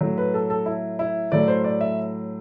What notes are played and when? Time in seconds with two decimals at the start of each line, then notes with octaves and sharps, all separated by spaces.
0.01 A2 F#3 A3
0.18 B4
0.34 A4
0.50 A4
0.66 E4
0.99 E4
1.32 A2 F#3 A3 D5
1.48 C5
1.64 D5
1.81 E5